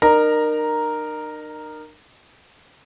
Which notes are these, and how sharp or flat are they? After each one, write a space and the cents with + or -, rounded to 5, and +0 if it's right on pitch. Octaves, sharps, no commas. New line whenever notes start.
D#4 -40 A#4 +0 A#5 +0